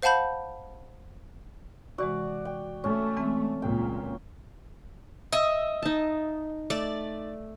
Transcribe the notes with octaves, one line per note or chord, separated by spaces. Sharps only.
C5 F5 F#5 A5 B5 G6
C3 E3 G#3 F#4 D5
G5
A3 C#4
E3 G#3 C4
C#2 A#2 G5
D#5 E5
D#4 A5
A3 D5